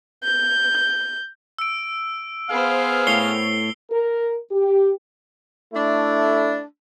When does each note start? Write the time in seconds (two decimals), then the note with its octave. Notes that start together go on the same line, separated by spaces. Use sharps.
0.22 G6
1.58 E6 D7
2.50 B3 G#4 C5 F5
3.07 A2 C#5 C7 F7 G7
3.91 A#4
4.50 G4
5.73 A3 D4 E4